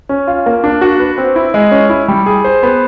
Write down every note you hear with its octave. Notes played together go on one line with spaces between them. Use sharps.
C#4
F4
A#3
D4
F#4
B4
C4
E4
G#3
C#4
E4
G3
G#4
C5
B3